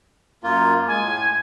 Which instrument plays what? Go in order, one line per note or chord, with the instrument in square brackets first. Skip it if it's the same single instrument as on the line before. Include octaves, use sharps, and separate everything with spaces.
[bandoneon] F#2 A#3 F4
[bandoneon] G#3 [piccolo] G#5
[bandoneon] A2